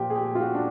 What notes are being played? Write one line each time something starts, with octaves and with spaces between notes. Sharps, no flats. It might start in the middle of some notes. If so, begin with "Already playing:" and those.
Already playing: A#2 F3 G4
G#4
G4
F4
F#4
D4